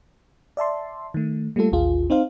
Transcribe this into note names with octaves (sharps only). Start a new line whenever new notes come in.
D5 E5 A5 C6
D#3 A3
G3 A3 A#3 F4 A4
A1 D#2 F4 G#4
C4 D#4 C5 F5